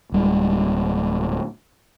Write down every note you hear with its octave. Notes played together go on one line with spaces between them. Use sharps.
D1 G3 G#3